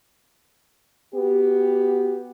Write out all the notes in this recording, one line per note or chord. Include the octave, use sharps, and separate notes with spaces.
B3 F#4 G4